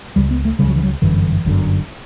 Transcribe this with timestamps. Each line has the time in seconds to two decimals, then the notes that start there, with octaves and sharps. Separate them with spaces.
0.16 C#2 C#3 G3
0.31 B3
0.45 A3
0.59 C#2 C#3 G3
0.68 F#3
0.76 E3
0.83 F#3
1.02 G1 F#2 D3 E3
1.45 G1 F#2 D3